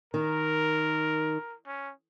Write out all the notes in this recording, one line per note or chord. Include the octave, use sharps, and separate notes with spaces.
D#3 A#4
C#4